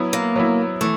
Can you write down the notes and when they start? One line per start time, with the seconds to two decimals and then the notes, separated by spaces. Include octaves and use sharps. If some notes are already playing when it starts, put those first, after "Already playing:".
Already playing: F#3 B3 E4
0.13 A#3
0.36 F#3 B3 E4
0.81 E3 A3